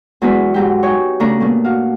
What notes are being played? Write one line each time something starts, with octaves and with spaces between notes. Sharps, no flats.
E2 F#3 G#3 B3 D4 B4
G#2 F#3 G4
D#4 C#5 G5 G#5
C#3 A3 D4 A#5
A#2 A3 B3
F#4 F5